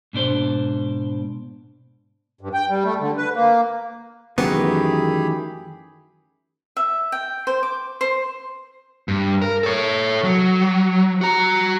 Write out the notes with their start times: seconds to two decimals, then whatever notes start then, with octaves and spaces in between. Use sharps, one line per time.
0.13 G#2 B2 D4 C5
2.41 G2
2.54 G5
2.69 G3
2.84 A3
3.00 D3
3.17 B4
3.35 A#3
4.38 F#2 D#3 E3 A3 B3 G4 G#4 B5
6.77 E5
7.12 G5
7.47 C5
7.63 D6
8.01 C5
9.08 G2
9.42 A#4
9.63 A4 C#5
10.24 F#3
11.21 F#4 A#5